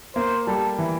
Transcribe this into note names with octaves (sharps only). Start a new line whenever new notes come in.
A#3 C5
G3 A4
E3